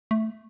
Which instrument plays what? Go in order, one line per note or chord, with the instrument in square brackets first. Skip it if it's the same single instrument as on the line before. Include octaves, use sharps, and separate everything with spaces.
[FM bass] A3